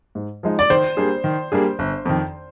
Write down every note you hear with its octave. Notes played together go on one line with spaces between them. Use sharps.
G#2
F3 G#3 D#4
D5
D#3 C5
G3 A#3 D4 G#4
D#3
G3 A#3 D4 G#4
G1
F2 D#3